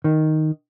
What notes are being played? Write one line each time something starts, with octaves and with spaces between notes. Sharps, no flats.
D#3